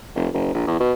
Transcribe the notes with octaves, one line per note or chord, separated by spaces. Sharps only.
F1
F#1
A#1
E2
B2